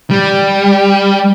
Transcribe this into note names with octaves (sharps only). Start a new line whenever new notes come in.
G3